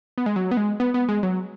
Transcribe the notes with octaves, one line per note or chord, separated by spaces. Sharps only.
B3
G#3
F#3
B3
G#3
B3
B3
G#3
F#3